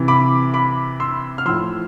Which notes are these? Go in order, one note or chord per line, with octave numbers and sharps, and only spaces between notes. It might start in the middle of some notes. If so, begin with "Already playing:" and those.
Already playing: C3 E3
B5 D6
B5 D6
C6 E6
F6
A2 F3 C6 E6